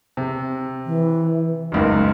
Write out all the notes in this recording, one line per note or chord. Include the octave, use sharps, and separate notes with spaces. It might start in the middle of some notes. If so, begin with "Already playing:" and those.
C3
E3
F#1 C#2 F#2 D#4